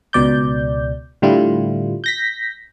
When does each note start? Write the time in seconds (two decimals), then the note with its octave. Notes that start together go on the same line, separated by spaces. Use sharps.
0.13 C#2 B2 D5 G6
1.22 A2 D3 G3 E4 F4
2.04 G6 A#6 B6